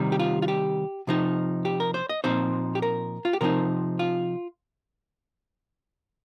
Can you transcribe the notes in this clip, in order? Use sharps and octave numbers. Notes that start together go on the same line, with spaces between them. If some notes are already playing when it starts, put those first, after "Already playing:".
Already playing: C3 D#3 G3
G4
F4
F4
G4
C3 F3 D#4
G4
A#4
C5
D#5
A#2 F3 C4 D#4 C5
G4
A#4
F4
G4
C3 F3 C4 D#4 A#4
F4